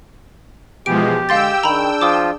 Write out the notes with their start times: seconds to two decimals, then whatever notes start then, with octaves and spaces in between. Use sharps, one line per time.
0.86 B2 E3 F3 G#3 G4 G#4 D7
1.29 D3 G#3 F5 G5 C6 E6 A6
1.63 D#3 D4 G#4 A#5 B5
2.01 F3 F4 D6 D#6